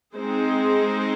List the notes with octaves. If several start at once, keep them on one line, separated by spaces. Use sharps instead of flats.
G#3 C4 D#4 G#4 C5